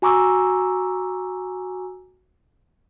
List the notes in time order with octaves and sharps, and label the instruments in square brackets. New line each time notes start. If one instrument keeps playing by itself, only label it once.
[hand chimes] F#4 G#5 A#5 C#6 D6 E6